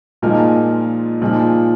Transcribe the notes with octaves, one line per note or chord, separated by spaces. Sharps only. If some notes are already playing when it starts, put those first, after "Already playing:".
A#2 F3 G#3 D#4 A#4
A#2 F3 G#3 D#4